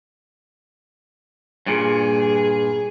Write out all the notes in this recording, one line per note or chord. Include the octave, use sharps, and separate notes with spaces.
G2 A#2 G#4